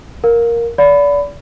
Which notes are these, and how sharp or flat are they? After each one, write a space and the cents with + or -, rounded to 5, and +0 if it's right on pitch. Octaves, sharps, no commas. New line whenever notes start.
A#4 +0 F5 +20
D5 -30 F5 +35 B5 +15